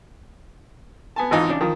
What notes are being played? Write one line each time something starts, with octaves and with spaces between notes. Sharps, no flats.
B3 G#5 A5
G#1 E3 D#4 F4
C#3 D4
D#3 F3